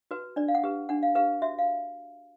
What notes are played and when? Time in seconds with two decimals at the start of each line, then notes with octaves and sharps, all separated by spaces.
0.11 F#4 B4
0.36 D4 D5
0.48 F5
0.55 F#5
0.64 G4 B4
0.89 D4 F#5
1.03 F5
1.15 G4 B4 F5
1.42 F#4 E5
1.59 F5